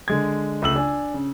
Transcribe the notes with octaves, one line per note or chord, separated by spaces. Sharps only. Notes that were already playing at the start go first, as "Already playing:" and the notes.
D3 G#3 G#6
C#2 A3 E6 F#7
D4 G#5
C#3